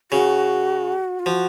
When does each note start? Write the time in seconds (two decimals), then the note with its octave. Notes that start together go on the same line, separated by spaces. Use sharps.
0.12 C#3 F#4
1.19 F4
1.26 F3 F#4